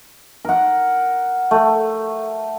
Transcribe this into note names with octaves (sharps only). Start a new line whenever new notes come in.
A#4 F#5
A3